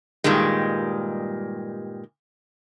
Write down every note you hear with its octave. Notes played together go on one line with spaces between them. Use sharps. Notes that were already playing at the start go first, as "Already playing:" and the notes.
G2 A#2 D#3 G3 G#3